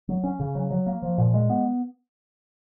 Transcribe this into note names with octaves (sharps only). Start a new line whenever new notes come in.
F#3
C#4
C#3
F#3
F#3
A#3
F3
A#2
G#3
B3